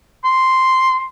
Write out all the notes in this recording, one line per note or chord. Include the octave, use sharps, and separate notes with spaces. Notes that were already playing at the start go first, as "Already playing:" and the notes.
C6